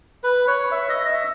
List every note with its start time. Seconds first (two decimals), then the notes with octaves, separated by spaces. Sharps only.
0.24 B4
0.47 C#5
0.72 E5
0.89 D#5
1.07 E5